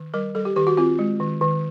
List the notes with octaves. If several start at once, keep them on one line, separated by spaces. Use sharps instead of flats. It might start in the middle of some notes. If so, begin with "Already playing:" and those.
Already playing: D#3
G3 A#4
G3 A4
G4
D#3 G4
F#4
C4 F4
G#3
D#3
D#3